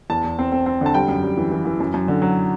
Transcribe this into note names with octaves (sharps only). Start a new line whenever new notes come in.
E2 A5
E2
C4
C4
C4
D3 A5
G3 G5
F#2
G3
E3
E3
E3
F#2
F#2
D3
F#3